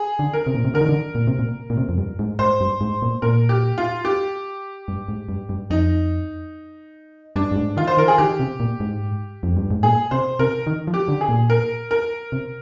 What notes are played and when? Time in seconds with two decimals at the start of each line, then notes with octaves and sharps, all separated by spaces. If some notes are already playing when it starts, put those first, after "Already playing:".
Already playing: G#4
0.19 D3
0.33 A#4
0.47 C3
0.55 A#2
0.65 C3
0.74 D3 A#4
0.81 D#3
0.89 D3
1.15 A#2
1.27 C3
1.39 A#2
1.70 A#2
1.77 C3
1.89 F2
1.98 G2
2.19 G#2
2.39 G#2 C5
2.61 G2
2.81 G#2
3.02 A#2
3.22 A#2 A#4
3.49 G4
3.78 F4
4.05 G4
4.88 G2
5.08 G#2
5.29 G2
5.49 G2
5.70 F2 D#4
7.36 G2 D4
7.52 G2
7.56 G#2
7.77 D#3 F4
7.87 C5
7.97 D#3 A#4
8.08 G#4
8.18 D#3 G4
8.40 C3
8.60 A#2
8.80 G#2
9.43 F2
9.57 G2
9.71 G#2
9.83 A#2 G#4
10.11 C3 C5
10.39 C3 A#4
10.67 D#3
10.87 F3
10.94 G4
11.08 D3
11.21 G#4
11.28 A#2
11.50 A#4
11.91 A#4
12.32 C3